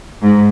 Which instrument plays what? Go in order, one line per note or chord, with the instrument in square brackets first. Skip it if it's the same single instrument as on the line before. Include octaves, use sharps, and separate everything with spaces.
[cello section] G#2